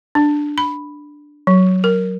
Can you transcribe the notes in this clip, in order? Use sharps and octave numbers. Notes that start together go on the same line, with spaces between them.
D4
B5
F#3
A#4